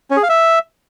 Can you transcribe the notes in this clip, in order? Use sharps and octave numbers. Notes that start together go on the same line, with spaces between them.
C#4
G#4
F5
E5